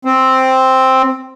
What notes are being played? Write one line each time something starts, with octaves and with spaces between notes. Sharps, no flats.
C4